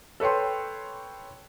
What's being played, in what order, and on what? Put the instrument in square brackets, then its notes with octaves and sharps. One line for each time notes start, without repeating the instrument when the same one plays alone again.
[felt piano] A4 B4 C#5 G5 C6